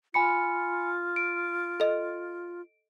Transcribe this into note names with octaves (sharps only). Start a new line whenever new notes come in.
F4 G#5 B5 C#7
D7
A4 D#5